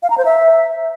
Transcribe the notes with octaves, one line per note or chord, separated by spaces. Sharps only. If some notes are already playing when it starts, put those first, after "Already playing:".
F5
A#5
C5
E5